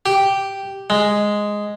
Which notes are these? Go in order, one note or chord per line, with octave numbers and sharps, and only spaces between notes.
G4
G#3